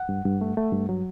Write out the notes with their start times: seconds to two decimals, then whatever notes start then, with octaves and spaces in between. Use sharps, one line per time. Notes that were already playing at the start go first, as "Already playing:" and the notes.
Already playing: F#5
0.09 G2
0.25 G2
0.41 A3
0.57 A3
0.73 G2
0.89 F#3